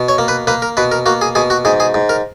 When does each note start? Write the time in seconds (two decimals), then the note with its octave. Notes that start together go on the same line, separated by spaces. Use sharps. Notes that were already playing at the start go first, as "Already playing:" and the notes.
Already playing: B2
0.09 C#5
0.18 A#3
0.28 B4
0.47 A#3 B4
0.62 A#4
0.77 B2 B4
0.92 A#4
1.06 A#3 F#4
1.21 G#4
1.35 B2 G#4
1.50 F#4
1.65 G#2 G#4
1.80 G#4
1.94 G#2
2.09 A#4